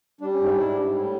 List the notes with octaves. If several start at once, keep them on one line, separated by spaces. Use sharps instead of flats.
G3 D4
C#4
G#2
C#4 D#4
G#2 D4 E4
G3
A2